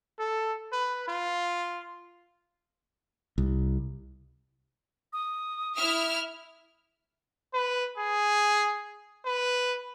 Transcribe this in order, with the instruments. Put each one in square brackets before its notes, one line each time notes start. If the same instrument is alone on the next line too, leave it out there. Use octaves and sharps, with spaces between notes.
[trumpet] A4
B4
F4
[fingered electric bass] C2
[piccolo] D#6
[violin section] E4 E5 F6
[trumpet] B4
G#4
B4